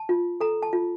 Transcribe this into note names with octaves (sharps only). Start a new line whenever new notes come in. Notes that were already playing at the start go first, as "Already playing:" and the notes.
Already playing: A5
F4
A4 A#5
A5
F4